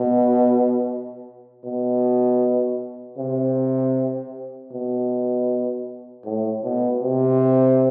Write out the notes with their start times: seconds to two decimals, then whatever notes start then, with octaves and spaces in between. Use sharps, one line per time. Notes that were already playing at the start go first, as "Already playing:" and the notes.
Already playing: B2
1.64 B2
3.18 C3
4.72 B2
6.25 A2
6.64 B2
7.03 C3